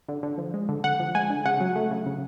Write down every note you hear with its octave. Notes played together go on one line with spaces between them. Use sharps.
D3
D3
F3
G#3
D3
D3 F#5
F3
G#3 G#5
D3
C#3 F#5
F#3
A3
C#3
C#3